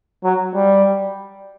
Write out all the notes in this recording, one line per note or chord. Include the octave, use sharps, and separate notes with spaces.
F#3
G3